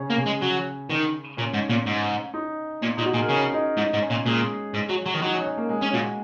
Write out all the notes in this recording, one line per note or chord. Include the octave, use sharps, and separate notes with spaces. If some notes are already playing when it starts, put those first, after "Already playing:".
Already playing: C#3 C#4
A#3
C#3 C#4
G#3
F#3
D#3
A#2 C#4 C#5
G#2
A#2
G#2
D#4 D#5
A#2
A#2 D#4
F#4
A#2 G#4
A#4
C#3 C#4 C#5
D#4 D#5
G#2 D#4 D#5
G#2
C#4 C#5
A#2
A#2 G#3 G#4
G#2
F#3
F#3
D#3
F#3 D#4 D#5
C#4 C#5
C#4 C#5
A#3 A#4
G#3 G#4
C#4
A#2 F#3 F#4